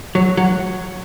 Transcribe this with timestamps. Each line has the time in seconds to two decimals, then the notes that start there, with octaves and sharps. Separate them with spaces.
0.15 F#3
0.37 F#3